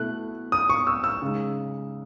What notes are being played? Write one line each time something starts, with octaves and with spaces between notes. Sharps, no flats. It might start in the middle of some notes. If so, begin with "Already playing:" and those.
Already playing: B2 A3 E4 F#6
D#6
C#6
E6
E6
C#3 G#3 D#4